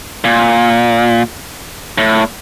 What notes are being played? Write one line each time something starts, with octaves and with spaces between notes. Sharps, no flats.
A#2
A2